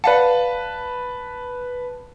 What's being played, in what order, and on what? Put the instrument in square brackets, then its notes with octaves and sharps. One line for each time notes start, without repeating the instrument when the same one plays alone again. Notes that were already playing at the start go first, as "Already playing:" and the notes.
[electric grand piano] B4 A5 [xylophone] D5 F5 F#5